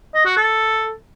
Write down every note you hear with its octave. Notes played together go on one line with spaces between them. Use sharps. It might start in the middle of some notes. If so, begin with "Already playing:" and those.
D#5
F#4
A4